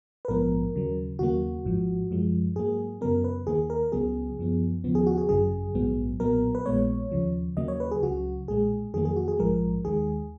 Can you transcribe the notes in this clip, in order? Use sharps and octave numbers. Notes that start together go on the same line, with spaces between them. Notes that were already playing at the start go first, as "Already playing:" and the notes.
B4
A#1 G#2 F3 B3 A#4
D#2 C#3 F#3
D#2 C#3 F#3 A#3 F#4
G#1 G#2 F3
F#2 F3 G#3
G#2 F#3 A#3 G#4
F#2 C#3 F#3 B3 A#4
B4
D#2 D#3 A#3 G#4
A#4
C#2 C#3 F#3 B3 G#4
F#2 F3 B3
D#2 C#3 F3 B3
G#4
F#4
G#4
G#1 F#2 C#3 F#3 G#4
A#1 G#2 F#3 B3
B1 A#2 F#3 B3 A#4
B4
A#1 A#2 G#3 B3 C#5
D#2 C#3 F3
D#2 C#3 F#3 A#3 D#5
C#5
B4
G#4
C#2 C#3 F#3 F#4
B1 A#2 G#3 G#4
F2 D#3 F#3 A#3 G#4
G#4
F#4
G#4
A#1 G#2 F3 G#3 A#4
D#2 D#3 G#3 G#4